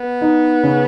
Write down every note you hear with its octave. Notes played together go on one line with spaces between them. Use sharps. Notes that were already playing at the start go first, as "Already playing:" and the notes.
Already playing: B3
D#4
C#3